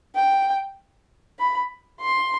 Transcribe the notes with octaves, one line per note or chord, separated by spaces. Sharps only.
G5
B5
C6